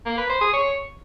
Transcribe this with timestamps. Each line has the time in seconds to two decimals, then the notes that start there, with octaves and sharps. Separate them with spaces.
0.05 A#3
0.17 B4
0.29 C5
0.41 G#4
0.53 C#5